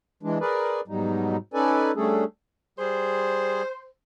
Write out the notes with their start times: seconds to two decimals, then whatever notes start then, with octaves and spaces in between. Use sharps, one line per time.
0.23 E3 G#3 D4
0.41 G#4 A#4 B4 D5
0.88 G#2 B2 F#3 G3 D#4
1.54 C#4 D#4 A4 B4 D5 G#5
1.96 G3 A3 C#4 D4 G#4 A4
2.79 G3 G#4 C5